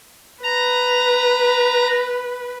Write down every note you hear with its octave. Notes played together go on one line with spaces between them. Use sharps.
B4 A#5